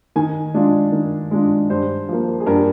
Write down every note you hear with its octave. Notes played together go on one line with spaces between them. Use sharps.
D#3 G#5
G#3 D4 F4
D#3
G#3 D4 F4
G2 C5
F3 A#3
G#4
G2 A#4